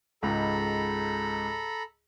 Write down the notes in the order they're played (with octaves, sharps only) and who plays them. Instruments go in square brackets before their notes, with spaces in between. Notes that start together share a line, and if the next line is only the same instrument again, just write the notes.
[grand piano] C#2 G#2 [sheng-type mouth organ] A4 A#5 B5